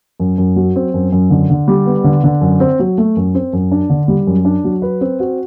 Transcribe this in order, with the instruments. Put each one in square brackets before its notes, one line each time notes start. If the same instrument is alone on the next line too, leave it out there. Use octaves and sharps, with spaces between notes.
[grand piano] F#2
F#2
F#3
C4
F#2
F#2
D3
D3
G3
B3
D3
D3
F#2
C4
F#3
A3
F#2
C4
F#2
D4
D3
G3
F#2
D4
F#3
B4
C4
F#4